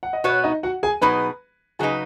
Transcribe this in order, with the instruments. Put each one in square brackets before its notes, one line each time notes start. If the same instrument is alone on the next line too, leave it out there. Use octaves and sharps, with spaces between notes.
[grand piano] F#5
D#5
[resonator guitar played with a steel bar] B2 B3 F#4 B4 [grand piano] C#5
[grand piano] D#4 D#5
F#4 F#5
G#4 G#5
[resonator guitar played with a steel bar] B2 F#3 D#4 G#4 [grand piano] B4 B5
[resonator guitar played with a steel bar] C#3 F#3 D#4 B4 [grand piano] G#4 G#5